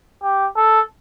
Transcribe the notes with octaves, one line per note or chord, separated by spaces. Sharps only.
G4
A4